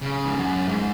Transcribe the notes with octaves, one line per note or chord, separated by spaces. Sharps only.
C#3
G#2
F#2
G#2